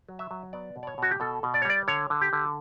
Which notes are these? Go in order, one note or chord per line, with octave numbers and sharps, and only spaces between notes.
F#3
E5
F#3
B3 D5
B2
D5
C#5
B2 F#4
G4
B2 A4
B2
D5
C#5
G3 D5
D3 C#5
D3
G4
D3